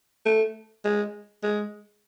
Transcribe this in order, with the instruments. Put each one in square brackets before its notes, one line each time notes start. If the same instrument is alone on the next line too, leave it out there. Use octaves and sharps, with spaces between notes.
[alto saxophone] A3
G#3
G#3